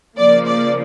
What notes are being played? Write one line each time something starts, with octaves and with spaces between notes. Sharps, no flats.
C#3 F3 A#3 D5
D5